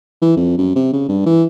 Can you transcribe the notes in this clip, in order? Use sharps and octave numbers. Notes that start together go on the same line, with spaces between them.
E3
F2
F#2
C3
C#3
G2
E3